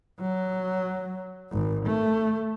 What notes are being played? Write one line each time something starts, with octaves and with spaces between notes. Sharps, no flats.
F#3
G#1
A3